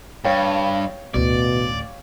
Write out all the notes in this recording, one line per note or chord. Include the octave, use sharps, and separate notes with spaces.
G2 C#5 F5 G5
A1 D2 B2 D5